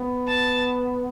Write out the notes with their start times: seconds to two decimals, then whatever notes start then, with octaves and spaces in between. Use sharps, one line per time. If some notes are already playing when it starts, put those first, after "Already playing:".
Already playing: B3
0.28 A5